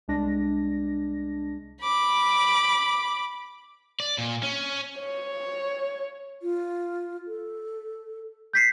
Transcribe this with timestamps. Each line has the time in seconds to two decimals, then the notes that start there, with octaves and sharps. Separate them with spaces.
0.08 C2 G#3 D4 A#6
1.82 B5 D6
4.00 D5
4.18 A#2
4.43 C#4
5.00 C#5
6.42 F4
7.27 A4
8.53 G6 B6 C7